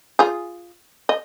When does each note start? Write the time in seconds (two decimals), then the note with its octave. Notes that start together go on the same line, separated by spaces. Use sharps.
0.19 F4 G#4
1.09 D#5